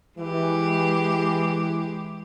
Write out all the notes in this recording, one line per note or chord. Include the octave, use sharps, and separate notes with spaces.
E3 G#3 G4